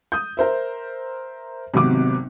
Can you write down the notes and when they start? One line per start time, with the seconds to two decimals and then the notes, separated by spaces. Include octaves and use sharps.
0.12 D#6 G6
0.37 A#4 C5 E5
1.74 G#1 C3 F#3 B3 D6